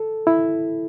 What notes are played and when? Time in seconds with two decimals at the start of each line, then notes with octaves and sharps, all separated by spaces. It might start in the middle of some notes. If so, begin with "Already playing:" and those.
Already playing: A4
0.27 E4